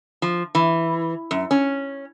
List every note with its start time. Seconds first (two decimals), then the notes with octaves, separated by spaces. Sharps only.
0.22 F3
0.55 E3
1.31 F#2
1.51 C#4